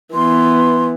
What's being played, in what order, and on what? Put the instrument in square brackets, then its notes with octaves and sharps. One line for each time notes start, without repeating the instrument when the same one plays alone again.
[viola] E3 B3 [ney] C6